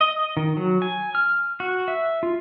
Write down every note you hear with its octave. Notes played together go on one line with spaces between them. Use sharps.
D#5
D#3
F#3
G#5
F6
F#4
E5
F4